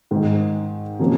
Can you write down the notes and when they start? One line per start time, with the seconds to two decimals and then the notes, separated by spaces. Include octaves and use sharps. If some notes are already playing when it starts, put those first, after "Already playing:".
0.11 G#2 D#3 G#3
0.99 C3 F3 A#3 C#4